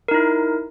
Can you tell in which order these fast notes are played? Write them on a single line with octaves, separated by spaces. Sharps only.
A#4 D#4 E4